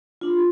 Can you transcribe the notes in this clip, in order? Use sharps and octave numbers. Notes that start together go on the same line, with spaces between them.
D4 F4